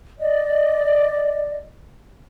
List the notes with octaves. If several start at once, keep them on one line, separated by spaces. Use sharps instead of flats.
D5 D#5